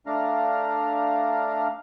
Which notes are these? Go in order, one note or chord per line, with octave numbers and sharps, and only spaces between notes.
A3 D4 F5 A#5 F6